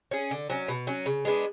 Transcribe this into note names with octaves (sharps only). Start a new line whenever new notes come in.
C#4 G#4
D3
F#3 C#4
B2
F#3 C#4
C#3
G#3 B3 D4